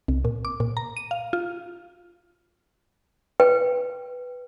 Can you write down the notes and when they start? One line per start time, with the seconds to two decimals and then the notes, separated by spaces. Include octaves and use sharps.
0.08 C2
0.25 A#2
0.45 D6
0.60 A#2
0.77 A#5
0.97 D#7
1.11 F5
1.33 F4
3.40 B4 G5